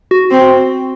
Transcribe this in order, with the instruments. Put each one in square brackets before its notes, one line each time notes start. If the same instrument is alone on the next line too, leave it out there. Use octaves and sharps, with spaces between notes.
[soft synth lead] F#4
[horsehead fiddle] C4